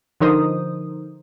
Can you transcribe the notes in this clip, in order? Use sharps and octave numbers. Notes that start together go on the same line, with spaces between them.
D3 F3 D#4 A#4 C5 D#6